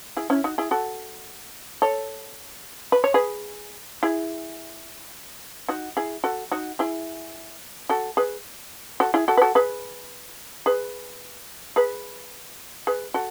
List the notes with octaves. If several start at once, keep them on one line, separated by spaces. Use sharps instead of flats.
E4 G#4
C#4 E4
D#4 F#4
E4 G#4
F#4 A4
A4 C#5
B4
C#5
G#4 B4
E4 G#4
D#4 F#4
E4 G#4
F#4 A4
D#4 F#4
E4 G#4
F#4 A4
G#4 B4
F#4 A4
E4 G#4
F#4 A4
B4
F#4 A4
G#4 B4
G#4 B4
G#4 B4
G#4 B4
F#4 A4